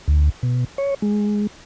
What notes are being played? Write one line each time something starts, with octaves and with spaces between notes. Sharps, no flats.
D2
B2
C#5
G#3